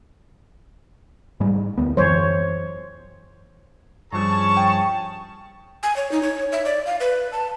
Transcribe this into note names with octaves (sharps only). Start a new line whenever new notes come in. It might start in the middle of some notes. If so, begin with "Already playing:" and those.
G#2 G3 G#3
D2 B3
F#2 E3 F#3 C5 C#5
G2 F3 G3 C#4 G#4 A5 C#6
G5
G#5
C#5
D#4
C#5
E5
D5
F5
B4
A5